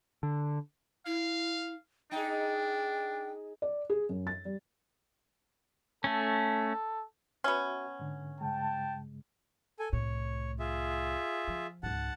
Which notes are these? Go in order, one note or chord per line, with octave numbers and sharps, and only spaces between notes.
D3
E4 F5
D4 D#4 G#4 G5
D5
G#4
F#2
A6
G3
A3 C#4 A4
B3 C#4 F#4 E5 F#5
G#2 D3
G2 C#3 G#3 G5 A5
A4 G#5
C2 A2 C#5
F4 G#4 E5
F3
C#2 G#2 F#5 A5